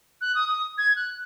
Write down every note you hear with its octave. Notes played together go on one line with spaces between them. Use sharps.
F#6
D#6
D#6
G#6
F#6